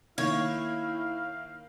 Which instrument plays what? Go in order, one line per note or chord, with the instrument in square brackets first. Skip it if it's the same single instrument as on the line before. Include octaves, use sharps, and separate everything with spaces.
[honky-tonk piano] D#3 A#3 [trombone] E4 [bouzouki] C#5 [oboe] F5